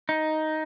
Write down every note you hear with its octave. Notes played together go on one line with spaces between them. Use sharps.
D#4